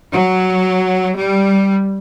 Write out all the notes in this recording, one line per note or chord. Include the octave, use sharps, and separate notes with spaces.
F#3
G3